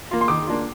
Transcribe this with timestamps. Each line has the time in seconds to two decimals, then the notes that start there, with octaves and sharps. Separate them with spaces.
0.11 A#3 F4
0.21 C6
0.28 D#3 D6
0.47 A#3 D4 F4